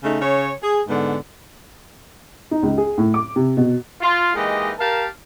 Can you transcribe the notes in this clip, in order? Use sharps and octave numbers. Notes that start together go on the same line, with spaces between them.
C#3 A3 D#4
C#3 C#5
G#4
G#2 D3 B3
D#4
C#2
G#4
A2
D6
C3
B2
F4
E3 G#3 A#3 D#4 G4 D#5
G4 A#4 F5 A5